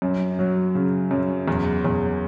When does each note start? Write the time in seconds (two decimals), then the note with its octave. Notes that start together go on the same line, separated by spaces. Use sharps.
0.02 F#2
0.39 F#3
0.75 C#3
1.11 F#2
1.48 E2
1.85 E2